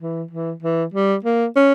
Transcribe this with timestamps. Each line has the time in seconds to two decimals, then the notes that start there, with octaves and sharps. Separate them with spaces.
0.02 E3
0.31 E3
0.63 E3
0.94 G3
1.25 A#3
1.56 C#4